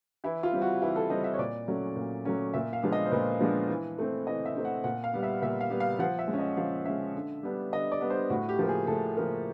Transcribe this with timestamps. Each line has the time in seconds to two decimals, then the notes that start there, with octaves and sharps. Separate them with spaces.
0.24 E3 E4
0.43 F4
0.52 G3 C4
0.62 F#4
0.82 E3 E4
0.96 A4
1.10 G3 C4 D#5
1.24 E5
1.34 C#5
1.38 A#2 D5
1.68 F#3 A3 C#4
1.96 A#2
2.25 F#3 A3 C#4
2.54 A#2 E5
2.73 F5
2.82 F3 G#3 B3 D4
2.92 D#5
3.06 C5
3.12 A#2 B4
3.41 F3 G#3 B3 D4
3.69 E3
3.98 A3 C4
4.27 E3 D#5
4.46 E5
4.56 A3 C4
4.65 F#5
4.84 A#2 F#5
5.04 F5
5.13 G3 B3
5.23 E5
5.42 A#2 E5
5.61 F5
5.70 G3 B3
5.80 F5
5.99 F3 F#5
6.19 E5
6.28 G#3
6.33 C#4
6.39 D#5
6.57 F3 F5
6.85 G#3 C#4 E5
7.15 D3
7.43 G3 B3 D4
7.72 D3 D#5
7.92 D5
8.01 G3 B3 D4
8.10 C5
8.30 A2 F#4
8.49 G4
8.59 F3 A#3
8.69 G#4
8.87 A2 A4
9.17 F3 A#3 A#4